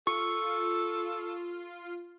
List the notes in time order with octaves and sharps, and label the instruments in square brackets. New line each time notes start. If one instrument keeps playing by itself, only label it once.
[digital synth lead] F4 [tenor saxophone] A4 [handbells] C#6